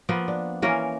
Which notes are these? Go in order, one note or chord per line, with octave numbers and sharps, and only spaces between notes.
F3 A#3 B3
D4
E3 A#3 C#4 A#4